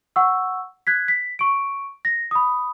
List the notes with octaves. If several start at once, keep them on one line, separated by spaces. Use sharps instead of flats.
F#5 C#6 E6
F#6 G#6 B6
B6
C#6 D7
A#6
B5 D#6